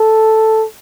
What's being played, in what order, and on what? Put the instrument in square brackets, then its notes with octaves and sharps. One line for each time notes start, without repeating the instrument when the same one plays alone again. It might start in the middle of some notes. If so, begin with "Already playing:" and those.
Already playing: [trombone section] A4